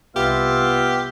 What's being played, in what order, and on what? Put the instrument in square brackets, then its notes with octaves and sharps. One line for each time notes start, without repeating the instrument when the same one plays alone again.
[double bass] C2 [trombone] B3 [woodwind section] F4 E5 [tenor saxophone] G4